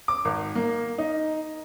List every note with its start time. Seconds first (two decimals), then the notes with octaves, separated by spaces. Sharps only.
0.08 D6
0.25 G#1
0.55 A#3
0.98 D#4